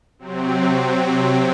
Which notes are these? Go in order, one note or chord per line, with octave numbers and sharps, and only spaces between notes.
C3 F#3 C4